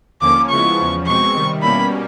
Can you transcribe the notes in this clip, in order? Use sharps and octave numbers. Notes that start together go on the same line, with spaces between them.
D#2 D3 F3 A#3 C#4 D6
C#3 F3 G#3 B3 E4 C#6
E2 C#3 F3
B2 G#3 C4 C#6
C3 D#3 G3
B2 G3 A#3 C#4 E4 B5